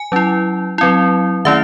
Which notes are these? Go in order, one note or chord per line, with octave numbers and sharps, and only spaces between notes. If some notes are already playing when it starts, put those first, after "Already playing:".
Already playing: G#5
F#3 C#4 E4
F#3 C4 E4
D#3 A3 C#4 E4 E5